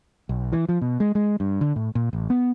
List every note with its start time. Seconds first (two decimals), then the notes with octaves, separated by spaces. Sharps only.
0.29 B1
0.52 E3
0.69 F3
0.82 B2
1.00 G#3
1.15 G#3
1.40 G2
1.61 D3
1.76 A2
1.95 A#2
2.13 A1
2.30 B3